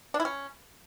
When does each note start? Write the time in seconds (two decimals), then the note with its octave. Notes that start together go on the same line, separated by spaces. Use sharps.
0.14 D4
0.20 E4
0.25 C#4